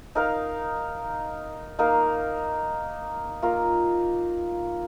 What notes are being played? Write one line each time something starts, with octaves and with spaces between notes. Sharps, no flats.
D#4 A#4 F5
A#3 D#4 A#4 F5
A#3 F4 A#4